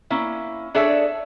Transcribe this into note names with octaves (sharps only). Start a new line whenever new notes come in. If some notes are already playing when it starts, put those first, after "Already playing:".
A#3 C#4 E4
D4 G#4 A4 C#5 D5 E5